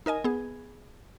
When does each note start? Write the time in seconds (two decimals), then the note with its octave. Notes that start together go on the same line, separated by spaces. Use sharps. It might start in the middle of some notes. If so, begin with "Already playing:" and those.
0.06 D#4 A#4 D#5 G#5
0.24 B3 G#4